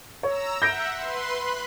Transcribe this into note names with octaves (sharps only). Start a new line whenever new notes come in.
C#5 A#5 E6
E5 F#5 G6 A#6 D7
B4 C6
B5 F#6